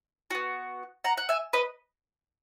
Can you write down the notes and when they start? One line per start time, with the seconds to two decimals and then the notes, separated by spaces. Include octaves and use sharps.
0.31 B3 F#4
1.04 F#5 A#5
1.17 F#5
1.29 E5 G#5
1.53 B4 D#5